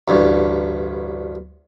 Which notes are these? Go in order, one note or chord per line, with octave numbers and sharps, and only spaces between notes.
A1 D2 G2